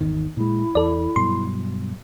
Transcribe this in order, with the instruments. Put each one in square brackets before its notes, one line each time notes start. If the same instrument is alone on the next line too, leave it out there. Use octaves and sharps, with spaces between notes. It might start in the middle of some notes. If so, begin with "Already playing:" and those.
[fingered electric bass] G#1 E2 D#3
[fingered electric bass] A#2 G#3 [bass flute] E4
[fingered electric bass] E2 [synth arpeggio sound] A4 D5
[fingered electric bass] G2 B2 F#3 [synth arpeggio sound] C6